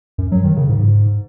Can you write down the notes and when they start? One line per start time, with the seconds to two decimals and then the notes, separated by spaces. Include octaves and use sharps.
0.18 F#2
0.32 F#3
0.44 D#3
0.56 C#3
0.69 G#2